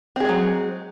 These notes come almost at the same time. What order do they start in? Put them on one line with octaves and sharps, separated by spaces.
C4 G#4 G#3 F#3